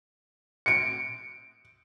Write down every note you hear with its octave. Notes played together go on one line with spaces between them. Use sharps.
C#7 D7